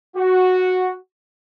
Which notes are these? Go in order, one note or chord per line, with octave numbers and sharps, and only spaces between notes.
F#4